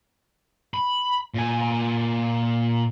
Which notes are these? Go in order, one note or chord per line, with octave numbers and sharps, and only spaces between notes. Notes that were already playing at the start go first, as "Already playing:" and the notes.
B5
A#2 G#5